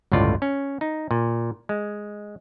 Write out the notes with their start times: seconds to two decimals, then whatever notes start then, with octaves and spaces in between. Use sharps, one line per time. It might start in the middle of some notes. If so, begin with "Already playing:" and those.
0.12 G1 C#2 A2 F4 D5
0.42 C#4
0.81 D#4
1.11 A#2
1.69 G#3